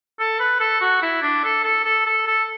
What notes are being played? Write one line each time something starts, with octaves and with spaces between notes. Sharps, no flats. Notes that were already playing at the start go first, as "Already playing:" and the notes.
A4
B4
A4
F#4
E4
D4
A4
A4
A4
A4
A4